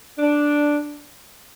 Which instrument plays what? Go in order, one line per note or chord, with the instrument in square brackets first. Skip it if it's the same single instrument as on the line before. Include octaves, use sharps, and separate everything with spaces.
[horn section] D4